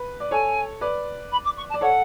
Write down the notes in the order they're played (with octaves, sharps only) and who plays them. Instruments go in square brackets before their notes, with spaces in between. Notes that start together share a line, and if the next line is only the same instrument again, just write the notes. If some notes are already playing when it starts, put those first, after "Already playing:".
Already playing: [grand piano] B4
D5
[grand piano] A4 C#5 [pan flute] G#5
[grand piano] B4 D5
[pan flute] B5
D6
C#6
A5
[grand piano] D5
[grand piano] A4 C#5 [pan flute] F#5